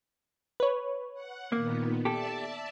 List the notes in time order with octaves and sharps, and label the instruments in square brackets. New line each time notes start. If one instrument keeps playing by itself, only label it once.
[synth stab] B4 C#5
[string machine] F#5
[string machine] A#2 D#3 B3 [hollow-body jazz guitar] A#3
[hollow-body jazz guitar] G4 A4 [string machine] D5 E5 A5